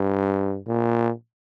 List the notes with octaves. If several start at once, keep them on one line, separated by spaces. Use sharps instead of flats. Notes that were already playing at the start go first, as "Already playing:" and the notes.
Already playing: G2
A#2